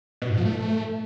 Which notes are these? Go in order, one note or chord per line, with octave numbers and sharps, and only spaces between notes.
B2
G#2
F3
A3